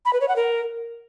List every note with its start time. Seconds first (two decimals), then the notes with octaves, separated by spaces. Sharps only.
0.05 B5
0.13 B4
0.21 C#5
0.28 F#5
0.36 A#4